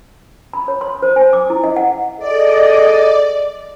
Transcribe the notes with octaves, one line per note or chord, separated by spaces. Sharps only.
B5
C#5
C6
C5
G#5
D6
E4
D#5
F#5
G#4 A4 D5 D#5